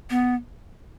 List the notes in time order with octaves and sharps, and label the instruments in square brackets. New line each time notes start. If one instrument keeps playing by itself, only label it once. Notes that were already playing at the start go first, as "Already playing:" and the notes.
[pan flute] B3